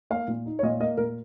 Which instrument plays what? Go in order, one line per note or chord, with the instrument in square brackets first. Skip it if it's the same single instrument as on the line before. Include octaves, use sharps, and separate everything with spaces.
[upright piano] A#3 F5
A#2
D#4
C#5
A#2 D#5
A#3 D#5
A#2 A#4